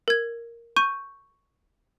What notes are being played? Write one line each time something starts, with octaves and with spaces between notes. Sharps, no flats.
A#4 G#6
C#6 G6 D#7